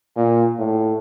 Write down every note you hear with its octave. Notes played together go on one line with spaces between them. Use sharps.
A#2
A2